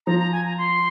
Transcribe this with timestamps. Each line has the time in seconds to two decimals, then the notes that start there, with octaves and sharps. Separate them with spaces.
0.06 F3 A#5
0.19 A#5
0.32 G#5
0.45 A#5
0.58 C6